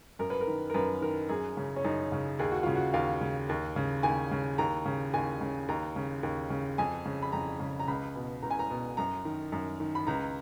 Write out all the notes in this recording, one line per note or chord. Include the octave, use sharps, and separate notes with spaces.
F#2 A#4
B4
A#4
D#3
A#4
F#2 B4
D#3 A#4
F#2 G#4
C#3
C#4
F#2 D#4
C#3
D#2 G#4
F#4
C#3 F4
F#4
D#2 F5
C#3
D#2
C#3
D#2 G#5
C#3
D#2 A#5
C#3
D#2 G#5
C#3
D#2 A#5
C#3
D#2
C#3
F2 G#5
C#3
B5
F2 A#5
C#3
A#5
C#2 B5
B2
C#2 A#5
G#5
A#5
B2
F#2 A#5
D#3
F#2
D#3
B5
C#2 A#5